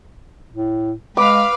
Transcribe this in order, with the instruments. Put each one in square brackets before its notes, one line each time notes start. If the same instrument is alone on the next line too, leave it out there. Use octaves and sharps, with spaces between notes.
[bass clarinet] A2
[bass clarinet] G#3 [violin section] B4 F5 F6 [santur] D6